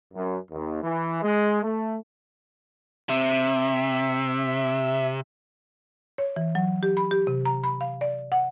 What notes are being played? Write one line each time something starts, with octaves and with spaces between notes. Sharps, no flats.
F#2
D#2
E3
G#3
A3
C3 E5
C#5
E3
F#3
G4
B5
G4
C3
A#5
B5
F5
D5
F#5